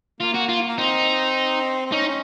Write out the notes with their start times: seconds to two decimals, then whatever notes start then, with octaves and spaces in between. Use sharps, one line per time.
0.21 A#3 F4
0.34 F#4
0.49 F4
0.68 A#3
0.78 C4 D#4
1.86 C4
1.92 C#4 D#4
2.07 C#4